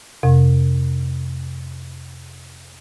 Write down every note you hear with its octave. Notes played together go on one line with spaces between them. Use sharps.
F2 C3